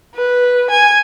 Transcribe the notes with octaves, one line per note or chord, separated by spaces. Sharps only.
B4
G#5